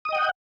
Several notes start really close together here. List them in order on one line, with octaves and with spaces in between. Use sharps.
D#6 D#5 G5 F#5